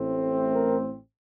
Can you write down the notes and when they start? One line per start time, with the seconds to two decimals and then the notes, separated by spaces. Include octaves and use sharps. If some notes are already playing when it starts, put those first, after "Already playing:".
Already playing: A1 A2 A3 C4
0.53 A#4